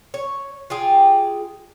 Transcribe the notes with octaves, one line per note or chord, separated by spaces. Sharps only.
C#5
F4 G4 G#4